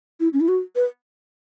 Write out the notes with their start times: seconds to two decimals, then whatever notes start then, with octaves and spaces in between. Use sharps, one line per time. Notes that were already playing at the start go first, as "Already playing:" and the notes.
0.20 E4
0.33 C#4
0.41 E4
0.48 F#4
0.76 B4